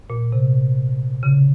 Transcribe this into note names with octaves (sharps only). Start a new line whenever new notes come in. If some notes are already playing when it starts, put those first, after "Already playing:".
A#2
C3
C#3